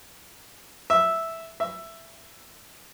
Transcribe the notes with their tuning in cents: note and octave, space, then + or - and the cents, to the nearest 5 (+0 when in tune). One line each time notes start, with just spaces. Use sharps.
E5 -5
E5 +10